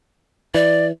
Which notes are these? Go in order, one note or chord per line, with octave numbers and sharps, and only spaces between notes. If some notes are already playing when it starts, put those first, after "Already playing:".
E3 D5